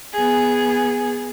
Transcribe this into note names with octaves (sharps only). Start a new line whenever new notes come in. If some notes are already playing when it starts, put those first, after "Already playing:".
B3 G#4